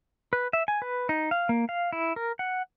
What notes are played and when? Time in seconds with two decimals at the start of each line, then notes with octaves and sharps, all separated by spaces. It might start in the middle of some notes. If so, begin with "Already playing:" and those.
0.33 B4
0.53 E5
0.68 G#5
0.82 B4
1.09 D#4
1.31 F5
1.49 A#3
1.69 F5
1.93 E4
2.16 A#4
2.39 F#5